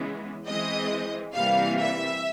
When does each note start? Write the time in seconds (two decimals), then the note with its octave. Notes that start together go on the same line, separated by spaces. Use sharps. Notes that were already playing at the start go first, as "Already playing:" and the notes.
Already playing: C#3 E3 G#3 B3
0.45 E3 G#3 C4 D#5
1.35 C3 E3 G3 A#3 F5
1.79 E5